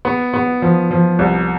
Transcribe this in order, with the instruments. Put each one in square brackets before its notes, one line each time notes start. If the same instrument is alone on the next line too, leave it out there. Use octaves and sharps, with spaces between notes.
[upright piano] B3
B3
F3
F3
C2